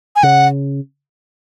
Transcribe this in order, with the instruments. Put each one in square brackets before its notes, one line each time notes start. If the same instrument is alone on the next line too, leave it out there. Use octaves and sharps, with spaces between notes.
[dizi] G#5
[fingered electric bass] C#3 [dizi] F#5